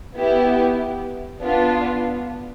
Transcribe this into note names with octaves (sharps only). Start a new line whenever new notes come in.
B3 E4 G4
B3 D4 F4